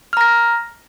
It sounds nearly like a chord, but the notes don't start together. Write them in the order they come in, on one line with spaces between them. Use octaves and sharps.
F6 A#5 A#6